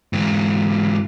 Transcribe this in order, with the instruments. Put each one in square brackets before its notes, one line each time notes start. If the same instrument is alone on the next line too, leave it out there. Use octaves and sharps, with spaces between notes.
[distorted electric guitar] G#2 E3